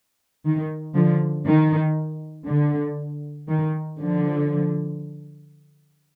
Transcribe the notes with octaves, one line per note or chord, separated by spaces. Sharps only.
D#3
D3 F3
D#3
D3
D#3
D3 F3